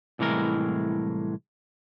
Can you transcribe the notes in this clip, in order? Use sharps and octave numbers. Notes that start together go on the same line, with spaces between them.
C2 A2 E3 G#3 A#4